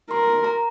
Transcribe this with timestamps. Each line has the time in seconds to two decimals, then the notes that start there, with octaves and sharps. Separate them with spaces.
0.10 A#4 C6
0.44 A#5